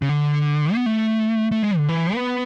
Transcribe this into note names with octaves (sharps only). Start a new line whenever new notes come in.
C#3
D3
B3
A3
A3
G#3
D3
E3
B3